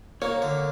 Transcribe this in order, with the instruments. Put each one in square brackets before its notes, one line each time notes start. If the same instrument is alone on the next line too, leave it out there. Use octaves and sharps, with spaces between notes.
[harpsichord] A#3 [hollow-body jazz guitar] C#5
[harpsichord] D3